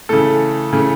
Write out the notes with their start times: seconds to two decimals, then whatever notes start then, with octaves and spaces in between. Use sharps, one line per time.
0.09 C#3 E3 A3 A4
0.73 C#3 E3 A3